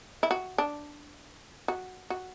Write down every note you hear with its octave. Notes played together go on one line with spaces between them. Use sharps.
E4
F#4
D4
F#4
F#4